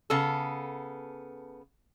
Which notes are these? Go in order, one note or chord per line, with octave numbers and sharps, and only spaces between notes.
C#3 B3 A4